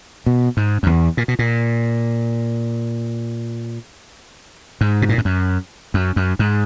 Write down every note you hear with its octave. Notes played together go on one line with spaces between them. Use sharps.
B2
G#2
F#2
E2
A#2
B2
A#2
G#2
B2
A#2
G#2
F#2
F#2
F#2
G#2